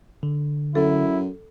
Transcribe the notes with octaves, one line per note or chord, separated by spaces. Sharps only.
D3
F#2 E4 A4